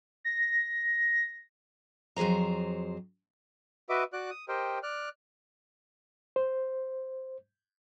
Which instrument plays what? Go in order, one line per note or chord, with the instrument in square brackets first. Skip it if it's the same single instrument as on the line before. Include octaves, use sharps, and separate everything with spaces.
[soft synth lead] A#6
[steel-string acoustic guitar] F2 F#3 G#4 C5 A#5
[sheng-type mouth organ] F#4 B4 D#5 E5 D6
F#4 D5 D6 F#6
D#6
G4 A#4 C5 D#5 G5
D5 F6 F#6
[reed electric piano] C5